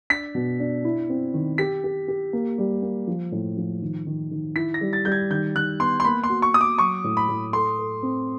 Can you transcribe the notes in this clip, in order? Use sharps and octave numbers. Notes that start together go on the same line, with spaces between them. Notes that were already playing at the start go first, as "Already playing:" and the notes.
D4 B6
B2
D4
E4
C4
D#3
G4 B6
G4
G4
A#3
G3
A#3
F3
A2
F3
D#3
D#3
D#3
E4 B6
A#6
G3
A6
G3 G6
G#6
D#3 G6
D#3 F#6
B3 C6
C6
A#3 B5
C6
F#4
C#6
F#4 D#6
D6
F#3 C#6
A2
B5
A2
A4 C6
A4
C4